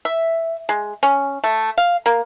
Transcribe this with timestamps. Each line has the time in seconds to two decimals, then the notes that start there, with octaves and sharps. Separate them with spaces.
0.05 E5
0.69 G#3
1.03 C#4
1.44 A3
1.78 F5
2.06 A#3